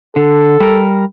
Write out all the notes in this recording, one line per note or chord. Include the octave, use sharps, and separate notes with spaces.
D3 A4
G3 A#4